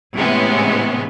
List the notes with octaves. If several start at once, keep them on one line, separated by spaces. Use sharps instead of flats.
A2 C3 E3 G#3 B3 C#4